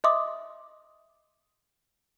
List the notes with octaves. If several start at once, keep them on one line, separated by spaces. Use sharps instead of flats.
D#5 E5 C6 D6 D#6